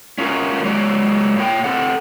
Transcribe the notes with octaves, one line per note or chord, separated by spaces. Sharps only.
C#4 F4 A#4
F#3 G#3 C#5 D5
A#2 C#5 G5
C4 A4 F#5